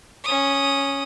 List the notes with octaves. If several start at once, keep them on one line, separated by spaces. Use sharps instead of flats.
C#4 D#6